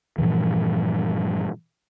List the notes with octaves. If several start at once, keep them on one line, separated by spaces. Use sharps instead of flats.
G2 A#2 E3 F3